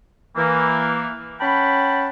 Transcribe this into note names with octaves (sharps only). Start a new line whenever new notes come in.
E3 A#3
C#4 F#5 G5 A5 B5